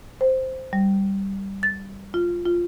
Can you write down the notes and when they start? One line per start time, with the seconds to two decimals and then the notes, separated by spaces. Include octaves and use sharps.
0.21 C5
0.73 G3
1.63 A6
2.14 F4
2.46 F4